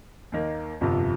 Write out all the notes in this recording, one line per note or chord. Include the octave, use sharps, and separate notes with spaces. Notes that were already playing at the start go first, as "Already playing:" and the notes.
D#2 D#3 A#3
G1 F2 C3 F3